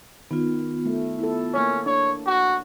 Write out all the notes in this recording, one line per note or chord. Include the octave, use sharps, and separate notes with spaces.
D#3 B3 F4
A3
E4 A4
A#3 C#4 C#5
D4 C#5
F#4